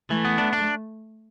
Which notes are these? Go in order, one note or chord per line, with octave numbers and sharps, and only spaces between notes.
E3 A3
B3
D4
D4